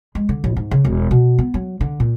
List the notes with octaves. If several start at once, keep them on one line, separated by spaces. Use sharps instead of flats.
G#3
D3
A1
G#2
C#3
E1
B2
B3
F#3
D3
A#2